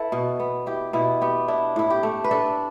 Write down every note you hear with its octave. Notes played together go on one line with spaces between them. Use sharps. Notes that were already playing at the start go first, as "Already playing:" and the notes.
Already playing: E4 A4 B4
B2
B3
E4 G4
B2 E4
B3 G4
D4 E4
A2 E4
G4
A3
B4
D4 A4